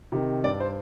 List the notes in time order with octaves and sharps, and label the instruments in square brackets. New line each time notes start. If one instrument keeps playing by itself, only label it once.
[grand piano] C3 D#3
G2 D5
C5